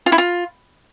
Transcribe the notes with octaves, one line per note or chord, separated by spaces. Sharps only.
F4
E4
F4